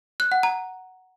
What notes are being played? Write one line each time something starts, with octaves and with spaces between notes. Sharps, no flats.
F#6
F#5
A#5